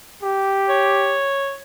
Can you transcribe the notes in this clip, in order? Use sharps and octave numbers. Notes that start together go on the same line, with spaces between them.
G4
C#5